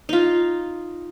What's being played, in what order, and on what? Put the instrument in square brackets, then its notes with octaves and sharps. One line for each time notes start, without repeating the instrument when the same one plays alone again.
[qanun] D#4 F4